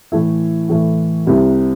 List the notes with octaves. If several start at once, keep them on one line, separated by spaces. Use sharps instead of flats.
A2 E3 A3 E4
A2 E3 A3 E4
C2 C3 G3